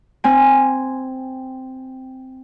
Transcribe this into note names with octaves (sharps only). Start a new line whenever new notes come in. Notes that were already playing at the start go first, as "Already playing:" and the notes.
C4 G#5